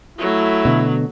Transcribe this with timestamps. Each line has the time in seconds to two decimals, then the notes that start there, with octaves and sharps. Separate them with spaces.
0.18 F#3 A3 E4
0.65 B2 D3